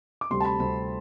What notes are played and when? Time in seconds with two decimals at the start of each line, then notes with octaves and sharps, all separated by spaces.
0.21 D6
0.30 D2 C3 G3 C4 C6
0.41 A5
0.45 B5
0.59 D2 C3 G3 C4 B5